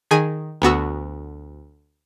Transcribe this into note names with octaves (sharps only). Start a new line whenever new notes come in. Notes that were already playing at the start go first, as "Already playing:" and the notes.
D#3 G#4 G#5
D2 B3 F#4 E6